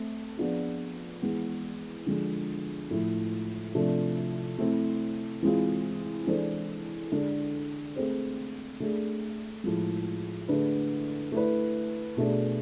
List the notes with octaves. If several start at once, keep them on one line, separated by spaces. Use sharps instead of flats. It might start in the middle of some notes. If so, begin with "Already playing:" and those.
Already playing: A3 C4
F3 B3 D4 F4 G#4
E3 G#3 B3
D3 F3 G#3
A2 F3 A3
C3 F3 A3 D4
A3 C4 E4
E3 G#3 C4 F4
E3 G#3 D4 A4 C5
D3 G#3 D4 A4
A3 C4 G#4 C5
A3 D4 G#4
A2 F3 G#3
D3 A3 D4 G#4 B4
A3 E4 B4
B2 A3 D4 G#4